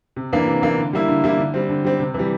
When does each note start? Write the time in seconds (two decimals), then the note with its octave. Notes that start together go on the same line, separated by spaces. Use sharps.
0.16 C3
0.33 E3 A#3 D4
0.47 C3
0.62 E3 A#3 D4
0.78 D3
0.93 G3 A#3 E4
1.08 D3
1.24 G3 A#3 E4
1.39 D3
1.54 G3 C4
1.69 D3
1.84 G3 C4
1.99 C3
2.14 E3 G3